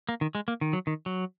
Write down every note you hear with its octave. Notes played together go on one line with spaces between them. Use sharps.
A#3
D#3
G#3
A#3
D#3
F#3
D#3
F#3